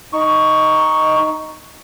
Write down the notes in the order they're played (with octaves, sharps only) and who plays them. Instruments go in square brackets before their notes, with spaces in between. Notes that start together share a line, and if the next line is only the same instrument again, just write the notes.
[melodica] D#4 C#6